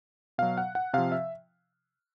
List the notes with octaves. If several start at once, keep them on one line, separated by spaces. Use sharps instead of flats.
B2 F#3 F5
F#5
F#5
C3 F3 F5
E5